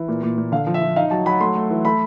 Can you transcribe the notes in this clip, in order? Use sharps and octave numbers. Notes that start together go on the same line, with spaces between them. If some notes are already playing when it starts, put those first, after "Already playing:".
Already playing: E3
A#2
A#2
A#2
D3 F5
F3
E5
F3
D#4 F5
F#3 A5
F#3 B5
A3 C6
A3
E3
A3 B5